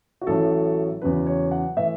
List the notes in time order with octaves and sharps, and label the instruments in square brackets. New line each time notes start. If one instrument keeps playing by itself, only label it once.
[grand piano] F#4
A1 A2 F#3 A4
E2 C#3 F#3 B4
C#5
F#5
A2 E3 E5